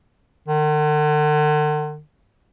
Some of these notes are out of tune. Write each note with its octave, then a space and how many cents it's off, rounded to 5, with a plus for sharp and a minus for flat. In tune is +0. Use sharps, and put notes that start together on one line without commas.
D3 +45